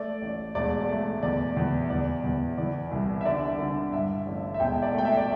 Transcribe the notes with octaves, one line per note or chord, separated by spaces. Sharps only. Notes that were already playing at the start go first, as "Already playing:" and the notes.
Already playing: A3 D5
A1
E1 D5
A3
E2 D5
E2
E2 D5
E2
E3 D5
C2
E5
D3 D5
D3
G2 E5
A1
E5
E1 G5
D5
A3 G5
E5
D5